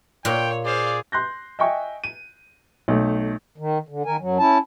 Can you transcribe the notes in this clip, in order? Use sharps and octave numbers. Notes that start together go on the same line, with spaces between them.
A#2 C#5 G5
G#4 C5 D5 F5
C6 F#6 G6 A#6
D#5 E5 G5 G#5 C#6
D#7
B1 A3
D#3
D3
D#3 A#4 G#5
F#2 F#3
C#4 E4 A5